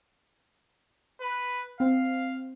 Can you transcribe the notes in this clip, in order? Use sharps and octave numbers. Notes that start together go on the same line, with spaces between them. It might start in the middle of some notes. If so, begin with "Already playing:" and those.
B4
C4 F5